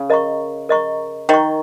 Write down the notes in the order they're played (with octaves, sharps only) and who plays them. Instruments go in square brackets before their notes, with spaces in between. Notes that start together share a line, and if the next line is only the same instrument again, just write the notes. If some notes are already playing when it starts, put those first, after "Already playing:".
Already playing: [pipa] C#3
[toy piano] A#4 D#5 A#5 C#6
A#4 D#5 A#5 C#6
[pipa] D#3 [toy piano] A#4 D#5 A#5 C#6